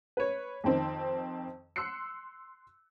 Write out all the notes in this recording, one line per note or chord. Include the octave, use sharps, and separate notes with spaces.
B4 C#5
F2 D#3 C4
C6 E6 F#6 C7 C#7